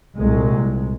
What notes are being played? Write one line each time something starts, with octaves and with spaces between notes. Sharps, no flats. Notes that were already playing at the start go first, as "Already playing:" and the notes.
C2 A#2 G#3